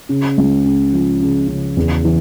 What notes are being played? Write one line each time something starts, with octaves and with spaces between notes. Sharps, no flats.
C#3
C#2
C#3
F3
C#3
C#3
E2
E3